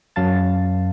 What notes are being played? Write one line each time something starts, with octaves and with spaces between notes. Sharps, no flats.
F#2 F#3 F5 A5 A6